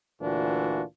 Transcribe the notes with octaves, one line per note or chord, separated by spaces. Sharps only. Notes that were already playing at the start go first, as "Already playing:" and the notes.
D2 A#2 E3 D4 F4 F#4